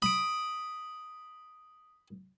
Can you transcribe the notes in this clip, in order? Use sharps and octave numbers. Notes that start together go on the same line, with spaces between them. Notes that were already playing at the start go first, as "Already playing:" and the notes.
B5 D#6 D7